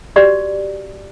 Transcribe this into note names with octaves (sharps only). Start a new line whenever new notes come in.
F#4 G4 D5